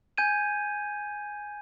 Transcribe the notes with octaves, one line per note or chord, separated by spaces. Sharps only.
G#5 G6 G#6 D#7